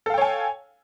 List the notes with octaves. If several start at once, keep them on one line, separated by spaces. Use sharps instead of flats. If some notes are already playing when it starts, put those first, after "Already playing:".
A4 C#5 F5 G5 G#5